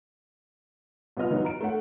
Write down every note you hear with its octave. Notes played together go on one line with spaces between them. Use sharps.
C2 B3 F4 D#5 F6
E3 F#3 B3 D#4
A#5 D7
A3 C#5 F#5